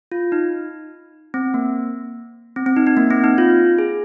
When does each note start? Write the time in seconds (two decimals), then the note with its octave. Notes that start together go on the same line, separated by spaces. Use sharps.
0.12 F4
0.32 D#4
1.34 C4
1.54 A#3
2.56 C4
2.66 C4
2.76 D#4
2.87 D#4
2.97 A#3
3.10 C4
3.24 D#4
3.38 F4
3.78 G#4